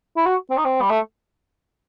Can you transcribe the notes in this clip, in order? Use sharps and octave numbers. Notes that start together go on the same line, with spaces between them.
E4
F#4
C4
D#4
C4
G3
A3